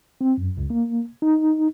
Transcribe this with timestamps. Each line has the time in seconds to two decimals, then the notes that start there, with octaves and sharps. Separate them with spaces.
0.21 C4
0.38 F#2
0.57 C#2
0.70 A#3
1.22 D#4